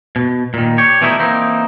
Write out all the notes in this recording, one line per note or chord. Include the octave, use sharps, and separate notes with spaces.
B2
A#2 D#3
G4 C#5
B2 E3 G3 A3 D#4 E4
E3 A#3 C4 D#4